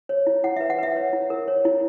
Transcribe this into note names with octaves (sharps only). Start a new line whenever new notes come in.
C#5
E4
E4 F#5
E5
B4
F#5
B4 E5
C#5
E4
A#4
C#5
E4